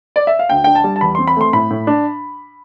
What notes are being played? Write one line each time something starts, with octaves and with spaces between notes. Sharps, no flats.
D5
E5
F5
D2 G5
D4 G5
A5
G3
A5
E2 B5
C4 C6
B5
A3 C6
A2 B5
A2
D4